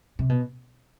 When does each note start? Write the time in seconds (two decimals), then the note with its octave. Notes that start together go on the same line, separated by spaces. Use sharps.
0.19 C3
0.29 B2